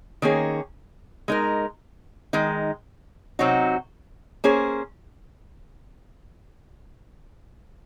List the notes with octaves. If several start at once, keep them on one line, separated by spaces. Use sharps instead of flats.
D#3 A#3 C#4 G#4
G#3 D#4 A#4
D#3 G#3 D#4
C3 F#3 C4 D#4 F#4
A#3 C#4 G#4 C5